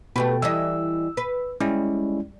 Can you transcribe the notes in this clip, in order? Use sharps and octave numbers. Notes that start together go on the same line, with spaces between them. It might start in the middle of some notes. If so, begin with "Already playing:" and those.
B2 A3 G4 B4 G5
E3 G3 D#5 E6
B4
G3 G#3 C#4 E4